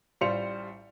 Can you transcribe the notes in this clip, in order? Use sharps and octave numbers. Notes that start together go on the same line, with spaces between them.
A1 G3 F4 C5 C#7 F7